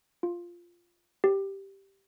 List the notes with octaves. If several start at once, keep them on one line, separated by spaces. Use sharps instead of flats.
F4
G4